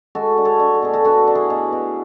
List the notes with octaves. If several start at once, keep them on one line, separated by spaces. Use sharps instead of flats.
G#3 F#4 A4
D4
A4 C#5
D4
A4
B2 G#4
F#4 A4
D4 F#4 A4
D4
E4 G#4
B2
B2